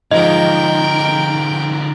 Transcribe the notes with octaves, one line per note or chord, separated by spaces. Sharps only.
G#2 D3 F3 D#4 A#4 D#5 G5